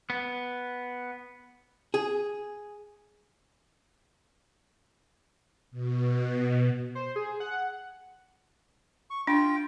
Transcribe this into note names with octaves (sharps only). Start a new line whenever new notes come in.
B3
G#4
B2
C5
G#4
F#5
C#6
D4 F4 G5